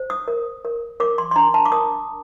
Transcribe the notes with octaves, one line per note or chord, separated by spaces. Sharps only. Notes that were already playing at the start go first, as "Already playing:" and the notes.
Already playing: C5
D#6
A#4
A#4
A#4 D6
C6
C6
D4 A#5
A5
D6
A#4 D#6